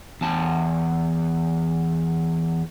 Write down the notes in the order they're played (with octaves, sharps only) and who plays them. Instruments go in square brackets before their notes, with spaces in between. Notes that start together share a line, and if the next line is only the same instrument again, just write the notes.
[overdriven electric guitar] E2 A5